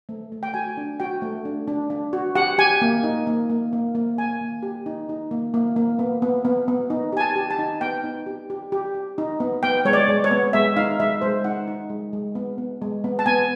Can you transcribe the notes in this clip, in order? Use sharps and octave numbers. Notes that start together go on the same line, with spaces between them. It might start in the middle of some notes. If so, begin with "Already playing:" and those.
A3
A3
G5
F#4 G#5
D4
F#4 G5
A3
D4
D4
D4
F#4
G4 F#5
G4 G#5
A#3
D#4
A#3
A#3
A#3
A#3
A#3 G#5
A#3
G4
D#4
D#4
A#3
A#3
A#3
B3
B3
B3
B3
D#4
G4 G#5
A5
G4
A5
D#4
B3 G5
D#4
G4
G4
G4
G4
D#4
B3
B3 G5
G#3 C#5
D5
G#3
C#5
B3
G#3 E5
D#4 F5
G#3 E5
G#3 C5
D#4 F#5
D#4
G#3
G#3
B3
B3
G#3
B3
A5
B3 G#5